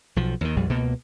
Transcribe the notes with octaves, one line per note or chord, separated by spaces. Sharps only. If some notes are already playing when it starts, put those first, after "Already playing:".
B1 F3
D#2 D#3
A#1 F2 G3
C#2 B2 A#3